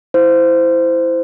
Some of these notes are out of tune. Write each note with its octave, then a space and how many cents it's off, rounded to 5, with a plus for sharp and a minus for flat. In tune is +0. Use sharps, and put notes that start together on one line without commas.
E4 +0 C5 -15